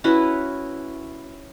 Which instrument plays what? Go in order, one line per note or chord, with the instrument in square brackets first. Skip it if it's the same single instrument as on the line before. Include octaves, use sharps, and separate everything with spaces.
[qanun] C#4 E4 F#4 B4